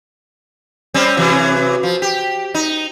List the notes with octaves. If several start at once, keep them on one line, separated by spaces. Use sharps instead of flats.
G3 C4 C#4
C3 E3 F#3
F3
G4
D#4